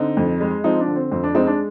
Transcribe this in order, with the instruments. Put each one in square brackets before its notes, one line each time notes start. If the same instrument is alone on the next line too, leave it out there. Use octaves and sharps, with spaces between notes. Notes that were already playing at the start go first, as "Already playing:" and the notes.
Already playing: [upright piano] D3 C4 D#4
F2
G#3
F3 C4 D#4
D4
D3
C4
F2 C4
D4
G#3 C4 D#4
D4